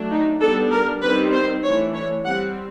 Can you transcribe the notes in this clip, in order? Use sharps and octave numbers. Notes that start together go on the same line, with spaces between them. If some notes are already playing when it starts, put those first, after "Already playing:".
Already playing: F#3 A3 D4
D#4
G3 B3 D4 A4
A#4
D#3 G3 C4 B4
C5
E3 A3 D4 C#5
C#5
G3 C4 F#5